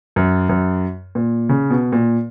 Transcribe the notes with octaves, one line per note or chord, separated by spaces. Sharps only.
F#2
F#2
A#2
C#3
B2
A#2